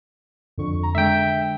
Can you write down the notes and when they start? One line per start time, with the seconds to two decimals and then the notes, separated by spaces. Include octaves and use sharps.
0.58 F2 D3 C#6
0.83 A#5
0.95 D3 G#3 E5 G5